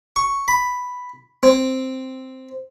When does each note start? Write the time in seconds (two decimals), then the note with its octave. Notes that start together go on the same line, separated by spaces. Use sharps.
0.16 C#6
0.48 B5
1.43 C4